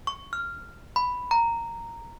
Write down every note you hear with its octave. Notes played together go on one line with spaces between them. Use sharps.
C#6
F6
B5
A#5